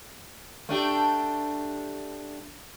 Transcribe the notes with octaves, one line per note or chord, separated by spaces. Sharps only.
A3 D4 G4